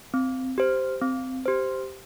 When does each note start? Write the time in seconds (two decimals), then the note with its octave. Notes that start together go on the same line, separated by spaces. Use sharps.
0.14 C4
0.58 G4 C5
1.02 C4
1.46 G4 C5